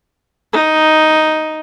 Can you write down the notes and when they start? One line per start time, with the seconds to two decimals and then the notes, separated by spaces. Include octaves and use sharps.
0.53 D#4